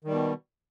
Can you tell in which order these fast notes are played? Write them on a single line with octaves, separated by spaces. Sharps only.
D#3 G3 B2